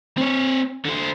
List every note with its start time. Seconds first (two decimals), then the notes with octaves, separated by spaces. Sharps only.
0.18 C4 C#5
0.85 D3 C5